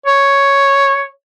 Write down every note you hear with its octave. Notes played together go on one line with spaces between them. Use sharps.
C#5